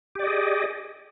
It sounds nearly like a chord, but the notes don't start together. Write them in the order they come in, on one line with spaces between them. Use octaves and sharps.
G4 D5 D#5 G#4